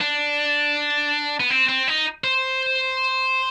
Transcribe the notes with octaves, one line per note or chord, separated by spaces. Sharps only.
D4
B3
C4
C4
D#4
C5